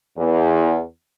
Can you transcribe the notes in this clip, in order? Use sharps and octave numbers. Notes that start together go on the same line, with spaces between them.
E2